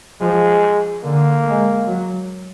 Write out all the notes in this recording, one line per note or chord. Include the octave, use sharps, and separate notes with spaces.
F3 G#3
D3 A#3
G#3
F#3